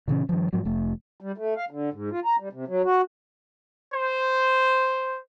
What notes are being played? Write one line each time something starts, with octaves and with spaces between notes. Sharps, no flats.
A#2 C#3 E3 C#4
G2 D#3 F3
G#2 F3 F#3
F1 A3
G3
A3
F5
D3
G#2
F4
A#5
G3
C3
F#3
F#4
C5